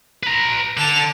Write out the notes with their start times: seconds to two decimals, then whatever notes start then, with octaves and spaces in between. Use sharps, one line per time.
0.23 B4 A#5
0.77 D3 A5 F7